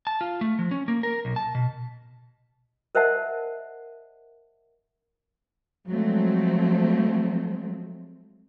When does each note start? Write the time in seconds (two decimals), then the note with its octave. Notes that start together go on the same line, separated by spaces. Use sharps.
0.07 A5
0.21 F4
0.41 A3
0.59 F3
0.71 C#4
0.88 A#3
1.03 A#4
1.25 B1
1.36 A5
1.55 B2
2.95 A#4 C5 D#5 E5 F#5 A5
5.88 F3 F#3 G#3 A3 C4